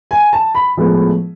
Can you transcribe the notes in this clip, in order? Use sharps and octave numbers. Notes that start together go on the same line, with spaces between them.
G#5
A5
B5
A2 F3 G#3 B3